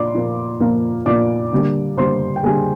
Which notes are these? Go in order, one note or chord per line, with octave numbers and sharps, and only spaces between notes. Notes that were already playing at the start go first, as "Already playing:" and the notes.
Already playing: A#2 F3 D5 C6 D6
A#2 F3 A#3
A#2 F3 A#3
A#2 F3 A#3 D5 D6
D3 G3 A#3
D3 G3 A#3 C5 C6
G5
D3 G3 A#3 G#4 G#5